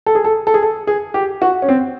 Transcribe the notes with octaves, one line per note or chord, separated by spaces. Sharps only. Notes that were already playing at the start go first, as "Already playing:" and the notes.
A4
G#4
A4
A4
G#4
A4
G#4
G4
F#4
C#4
C4